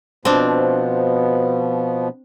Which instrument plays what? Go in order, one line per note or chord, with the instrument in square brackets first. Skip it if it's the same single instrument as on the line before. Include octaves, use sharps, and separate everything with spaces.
[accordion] B2 F3 B3 [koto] C4 D4